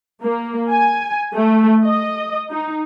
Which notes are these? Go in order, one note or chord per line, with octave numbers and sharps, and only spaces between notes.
A#3
G#5
A3
D#5
D#4